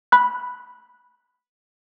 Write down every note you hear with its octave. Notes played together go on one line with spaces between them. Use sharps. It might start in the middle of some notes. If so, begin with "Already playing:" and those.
B5 F#6